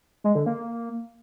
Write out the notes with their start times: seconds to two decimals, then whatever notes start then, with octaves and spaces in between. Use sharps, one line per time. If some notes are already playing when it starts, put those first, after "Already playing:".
0.24 G#3
0.35 D3
0.46 A#3